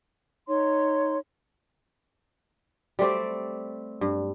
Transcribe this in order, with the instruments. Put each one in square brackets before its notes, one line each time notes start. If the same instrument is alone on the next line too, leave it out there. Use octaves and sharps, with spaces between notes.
[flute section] D#4 C#5 C6
[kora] G3 A3 C4 D5
G2